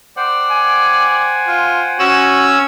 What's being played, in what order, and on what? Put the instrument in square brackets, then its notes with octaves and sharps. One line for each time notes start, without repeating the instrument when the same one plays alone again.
[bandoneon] C5 F#5 G5 [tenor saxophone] D5
[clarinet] G#5
[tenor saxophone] F4
[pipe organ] C#4 E6 [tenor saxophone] F#4